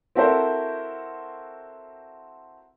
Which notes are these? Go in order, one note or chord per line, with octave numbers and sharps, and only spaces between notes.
C4 E4 F#4 A4 A#4 C5